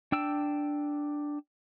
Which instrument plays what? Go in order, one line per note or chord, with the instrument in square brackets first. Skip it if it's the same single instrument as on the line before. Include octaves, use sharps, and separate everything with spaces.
[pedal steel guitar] D4 G5 E6